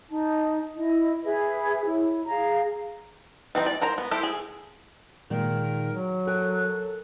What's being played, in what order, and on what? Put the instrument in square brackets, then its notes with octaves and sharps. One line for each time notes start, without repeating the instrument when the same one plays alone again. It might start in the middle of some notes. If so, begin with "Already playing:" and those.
[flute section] D#4 A5
E4 D#5
G#4 B4 E5 B5
E4 C#5
G#4 F5 A#5
[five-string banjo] E3 C4 D#4
D5
A#4 C5 A#5
B3
E4 G4 A4 C5
G#4
[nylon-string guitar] A#2 D#3 G#3 [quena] A#4
[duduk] F#3
[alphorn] A4 [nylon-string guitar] A#4 G#5 [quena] F#6